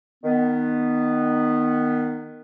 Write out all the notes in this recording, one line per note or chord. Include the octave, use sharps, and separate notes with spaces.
D#3 B3